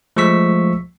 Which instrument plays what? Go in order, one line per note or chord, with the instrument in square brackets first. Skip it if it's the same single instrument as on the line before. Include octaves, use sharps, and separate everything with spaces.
[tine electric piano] F3 G#3 A3 C#6 E6 B6